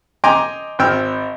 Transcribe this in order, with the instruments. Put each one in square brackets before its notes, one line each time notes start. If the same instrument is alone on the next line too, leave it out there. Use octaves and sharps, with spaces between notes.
[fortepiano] D#5 G5 G#5 A#5 C6 D6
G#1 C4 G5 E6 F6